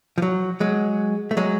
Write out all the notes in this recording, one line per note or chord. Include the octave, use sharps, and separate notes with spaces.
F3
F#3
F#3 G#3
A3
F#3 G#3